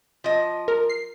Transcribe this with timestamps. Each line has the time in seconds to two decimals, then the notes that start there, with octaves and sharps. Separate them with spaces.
0.24 F3 D#5
0.68 A#4
0.89 C7